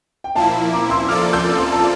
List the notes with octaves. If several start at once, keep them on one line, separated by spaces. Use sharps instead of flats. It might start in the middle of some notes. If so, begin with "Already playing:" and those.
G5
A#2 F3 A#3 E4 F5 A5
A#5 D6
C6 E6
F3 A#3 F4 A4 D5 D6 F6
E6 G6
C6 E6
A5